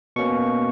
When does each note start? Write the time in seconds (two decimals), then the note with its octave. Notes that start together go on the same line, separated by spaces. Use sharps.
0.16 B2 A#3 C#4 C#6